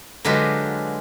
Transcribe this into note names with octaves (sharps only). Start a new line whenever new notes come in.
D3 F#3 G#3 F4 G4 B4